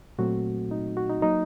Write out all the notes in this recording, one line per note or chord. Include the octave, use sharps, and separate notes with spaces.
A#2 F#3 A3 C4 F#4
D#4
F#4
D#4
F#3 A#3 D#4